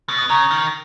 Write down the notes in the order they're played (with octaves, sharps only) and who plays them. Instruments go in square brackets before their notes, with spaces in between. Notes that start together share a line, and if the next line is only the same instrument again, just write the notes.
[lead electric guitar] B2
[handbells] D#6
[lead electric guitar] C#3 [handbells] A#5 C#6
[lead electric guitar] D#3